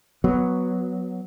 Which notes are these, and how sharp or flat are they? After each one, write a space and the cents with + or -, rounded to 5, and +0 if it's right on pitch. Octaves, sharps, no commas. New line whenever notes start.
F#3 -5 B3 +0